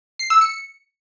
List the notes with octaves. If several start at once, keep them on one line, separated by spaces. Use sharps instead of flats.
C7
E6
C#7